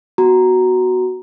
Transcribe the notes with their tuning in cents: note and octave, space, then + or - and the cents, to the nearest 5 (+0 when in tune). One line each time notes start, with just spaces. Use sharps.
B3 -5 F#4 +5 A#5 +0